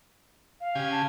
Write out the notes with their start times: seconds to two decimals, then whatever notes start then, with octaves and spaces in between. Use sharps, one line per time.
0.61 F5
0.75 C#3 G4 G#5
0.92 A5